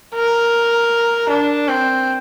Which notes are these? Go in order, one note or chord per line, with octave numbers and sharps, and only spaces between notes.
A#4
D4
C4